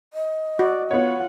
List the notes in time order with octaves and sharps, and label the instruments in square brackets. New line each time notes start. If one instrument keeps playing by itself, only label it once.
[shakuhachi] D#5
[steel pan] F#4 [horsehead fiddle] D5
[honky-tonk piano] B3 C#5 [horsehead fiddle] F4 F#5